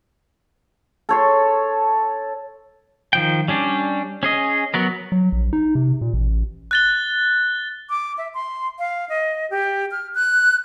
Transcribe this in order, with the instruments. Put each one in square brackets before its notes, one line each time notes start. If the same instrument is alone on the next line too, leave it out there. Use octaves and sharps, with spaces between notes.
[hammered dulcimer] A4 C#5 C6
[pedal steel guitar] D#3 F3 G5
G3 C#4 D4
C#4 G#4 D#5
F#3 B3 A#4
[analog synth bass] F#3
A#1
D#4
C3
A#2
A1
[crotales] F#6 A6 G7
[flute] D6
E5
C6
F5
D#5
G4
F6
F#6